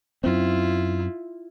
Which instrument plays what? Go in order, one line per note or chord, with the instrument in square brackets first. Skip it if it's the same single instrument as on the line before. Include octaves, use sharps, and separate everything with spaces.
[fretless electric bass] F#2 C4 [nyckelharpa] E4 F4